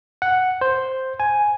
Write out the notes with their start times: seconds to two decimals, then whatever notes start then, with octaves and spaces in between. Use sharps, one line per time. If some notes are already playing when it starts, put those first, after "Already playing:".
0.22 F#5
0.61 C5
1.20 G#5